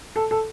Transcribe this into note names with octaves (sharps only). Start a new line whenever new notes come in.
A4
A4